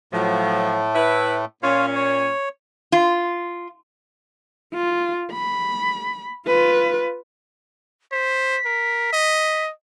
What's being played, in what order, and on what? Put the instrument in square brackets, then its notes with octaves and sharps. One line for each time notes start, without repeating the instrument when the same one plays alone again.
[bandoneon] A2 A3 [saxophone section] F3 F#3
[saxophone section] E4 B4
[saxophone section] A#2 C#4 [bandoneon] F4 C#5 F5
[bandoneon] C#5
[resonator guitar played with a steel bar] F4
[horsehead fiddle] F4
B5
F4 B4
[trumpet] C5 [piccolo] B6
[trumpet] A#4
D#5